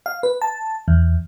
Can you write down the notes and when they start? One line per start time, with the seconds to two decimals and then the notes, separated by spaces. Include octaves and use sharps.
0.06 F5
0.23 B4
0.42 A5
0.88 E2